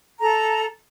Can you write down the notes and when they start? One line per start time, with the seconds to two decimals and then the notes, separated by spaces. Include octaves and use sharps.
0.20 A4 A#5